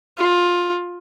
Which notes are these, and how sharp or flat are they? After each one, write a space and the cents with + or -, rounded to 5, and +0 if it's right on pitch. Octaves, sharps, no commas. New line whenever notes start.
F4 +15